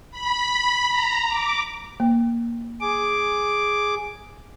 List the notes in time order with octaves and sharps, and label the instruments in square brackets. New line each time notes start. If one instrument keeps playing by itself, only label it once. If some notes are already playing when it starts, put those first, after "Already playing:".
[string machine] B5
A#5
D6
[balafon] A#3
[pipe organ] G#4 D6